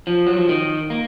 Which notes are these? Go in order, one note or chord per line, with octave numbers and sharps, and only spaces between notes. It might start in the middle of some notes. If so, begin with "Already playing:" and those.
F3
F#3
F3
D#3
A#3